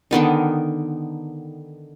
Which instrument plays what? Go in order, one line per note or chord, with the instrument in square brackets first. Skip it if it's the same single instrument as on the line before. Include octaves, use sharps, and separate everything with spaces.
[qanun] D3 D#3 B3 D#4